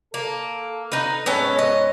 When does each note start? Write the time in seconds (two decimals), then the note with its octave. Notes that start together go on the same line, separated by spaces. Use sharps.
0.14 A#3 A4
0.92 D#4 B4
1.26 G#2 B3 C#4 A4 C#5
1.59 D#5